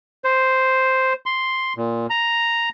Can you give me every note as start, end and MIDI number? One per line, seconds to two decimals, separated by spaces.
0.24 1.13 72
1.26 1.73 84
1.77 2.06 46
2.10 2.69 82